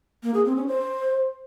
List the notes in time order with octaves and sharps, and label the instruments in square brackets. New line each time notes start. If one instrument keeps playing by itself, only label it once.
[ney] A#3
G#4
C4
C#4
C5